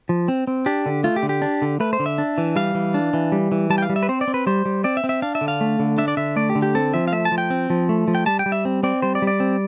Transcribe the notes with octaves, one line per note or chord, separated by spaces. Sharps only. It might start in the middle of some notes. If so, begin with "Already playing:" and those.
F3
C4
C4
D4 G4
D3
A3 F4
G4
D3
G4
D4
D3
A3 B4
C5
D3
E5
D4
E3
G3 F5
E3
D4
E3
G3
E3
G3 A5
G5
F5
G3
E5
B4
C4 C5
D5
C4
B4
G3 C5
G3
C4 D5
E5
C4
E5
D4 F5
E5
D3
F5
A3
D3
D4 E5
D5
D3 E5
A3 D5
G4
D3
G4
C4 A4
F3 E5
F5
A3 E5
A5
F3
G5
C4
F3
A3
F3
G5
G3 A5
G5
G3
E5
C4
C4 D5
G3 C5
D5
G3
D5
C4